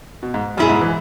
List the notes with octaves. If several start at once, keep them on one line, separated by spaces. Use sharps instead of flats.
B2
G#2
F#2 B2 B3 E4 G#4
G#2
E3